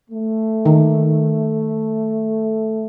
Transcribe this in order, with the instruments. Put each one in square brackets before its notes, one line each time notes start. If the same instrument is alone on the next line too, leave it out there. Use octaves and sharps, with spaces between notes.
[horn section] A3
[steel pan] D#3